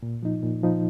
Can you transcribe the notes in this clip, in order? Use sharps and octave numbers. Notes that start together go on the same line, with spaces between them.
A#2
F3 D#4
A#2
F3 D#4